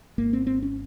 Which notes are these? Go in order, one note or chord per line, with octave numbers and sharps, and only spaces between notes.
G#1 G#2 A#3
C4
C4
C#4